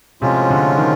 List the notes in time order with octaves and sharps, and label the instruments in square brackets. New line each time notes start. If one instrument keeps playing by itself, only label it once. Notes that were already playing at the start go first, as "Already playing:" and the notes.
[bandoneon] A2 F3 G#3 C#4 F4 [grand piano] C3
[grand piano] D3
D#3